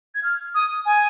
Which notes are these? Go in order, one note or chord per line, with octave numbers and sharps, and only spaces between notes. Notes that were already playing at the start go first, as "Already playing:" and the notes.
G#6
F6
D#6
G#5